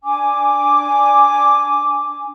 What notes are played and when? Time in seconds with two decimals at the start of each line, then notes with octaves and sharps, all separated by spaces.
0.04 D4 G#5 D6